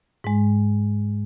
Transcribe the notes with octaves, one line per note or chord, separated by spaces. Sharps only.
G#2 G#3